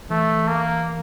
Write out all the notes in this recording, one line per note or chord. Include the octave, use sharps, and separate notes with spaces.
E3 A3
A#3